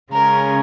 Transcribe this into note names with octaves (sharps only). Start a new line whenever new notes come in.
C#3 G#3 C#4 A#4